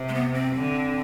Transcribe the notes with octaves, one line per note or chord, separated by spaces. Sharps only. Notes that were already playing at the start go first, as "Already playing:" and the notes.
Already playing: C3
G#3
B3
C4
D3